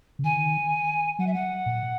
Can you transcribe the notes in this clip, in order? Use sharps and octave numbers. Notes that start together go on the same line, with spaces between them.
C#3
D#3 G#5
F#3 F#5
E5
F#5
A#2